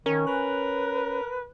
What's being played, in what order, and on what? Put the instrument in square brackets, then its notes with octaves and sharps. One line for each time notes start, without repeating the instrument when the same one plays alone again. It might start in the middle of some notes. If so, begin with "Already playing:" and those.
[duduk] D#3 [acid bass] C#4 [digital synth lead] A#4
[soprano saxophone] A#4 [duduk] B4 [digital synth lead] F#6